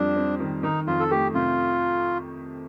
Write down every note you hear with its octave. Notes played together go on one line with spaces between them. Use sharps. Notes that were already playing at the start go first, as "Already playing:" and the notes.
Already playing: F2 G3 D4
C4
D#3
D#3 D#4
F2 F4
A4
A3 G4
C3 F4